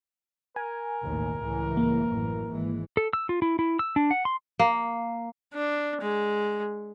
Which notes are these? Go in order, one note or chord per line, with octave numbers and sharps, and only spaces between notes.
A#4 G#5
A1 D#2 B2
C#2 A2 E3
A#3
A1 F#2 E3
G#1 E3 G#3
A4
E6
F4
E4
E4
E6
D4
F#5
C6
A#3
D4
G#3